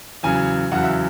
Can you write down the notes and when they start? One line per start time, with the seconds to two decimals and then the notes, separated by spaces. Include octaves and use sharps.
0.23 E2 C#3 F#3 G#5
0.71 E2 C#3 F#3 F#5
0.84 E5